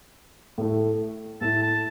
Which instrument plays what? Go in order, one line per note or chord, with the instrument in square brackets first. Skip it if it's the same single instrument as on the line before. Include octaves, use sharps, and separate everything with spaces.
[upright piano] A2 A3 E4
[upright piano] A2 A3 E4 [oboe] A5
[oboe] A5